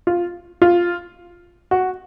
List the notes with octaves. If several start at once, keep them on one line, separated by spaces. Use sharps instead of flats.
F4
F4
F#4